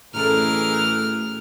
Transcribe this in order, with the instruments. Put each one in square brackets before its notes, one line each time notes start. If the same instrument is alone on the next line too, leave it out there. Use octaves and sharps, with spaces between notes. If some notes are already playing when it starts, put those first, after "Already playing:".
[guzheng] F#2 A3 D5 [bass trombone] A2 [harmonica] E3 G#4 A#4 [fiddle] F6